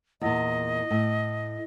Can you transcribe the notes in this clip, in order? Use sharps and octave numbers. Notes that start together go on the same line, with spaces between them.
E2 A#2 D#5
A2